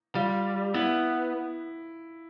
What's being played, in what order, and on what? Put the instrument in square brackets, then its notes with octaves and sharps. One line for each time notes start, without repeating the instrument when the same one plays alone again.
[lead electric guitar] G3 [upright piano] F4
[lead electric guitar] B3 [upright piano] E4